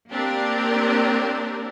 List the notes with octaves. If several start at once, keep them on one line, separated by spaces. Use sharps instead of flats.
A#3 C4 D4 G4 A#4